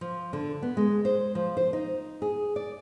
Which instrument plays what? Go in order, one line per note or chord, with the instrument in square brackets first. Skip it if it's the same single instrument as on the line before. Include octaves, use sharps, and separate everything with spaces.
[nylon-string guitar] F3
D3
B3
G#3
C5
F3
C5
D#4
G#4
D5